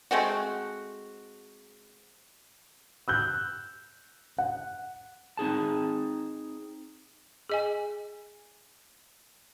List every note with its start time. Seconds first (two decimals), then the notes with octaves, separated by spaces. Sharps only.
0.11 G#3 A3 C4 F#4
3.08 E6 F#6 G6
4.38 F#5
5.37 C4 D#4 G#4 A5
7.49 G#4 D#5 G#5